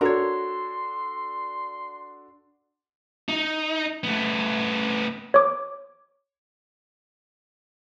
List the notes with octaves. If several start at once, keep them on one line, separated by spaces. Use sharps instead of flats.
D4 F#4 A4 A#4 C#5 C6
D#4
A3 B3
C#5 D6